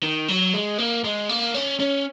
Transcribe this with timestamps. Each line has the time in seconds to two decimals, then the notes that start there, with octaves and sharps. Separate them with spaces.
0.03 D#3
0.29 F#3
0.54 G#3
0.78 A#3
1.04 G#3
1.29 A#3
1.54 C#4
1.80 C#4